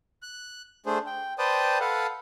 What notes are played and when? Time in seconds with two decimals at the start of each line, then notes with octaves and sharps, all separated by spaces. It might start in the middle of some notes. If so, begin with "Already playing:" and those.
0.22 F#6
0.86 A3 D4 G#4 C5
1.06 G5
1.38 B4 C5 D5 G5 A5 D#6
1.80 A4 B4 F5 F#5